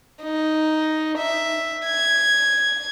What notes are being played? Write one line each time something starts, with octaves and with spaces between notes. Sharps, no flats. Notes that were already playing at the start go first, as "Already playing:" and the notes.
D#4
E5
G#6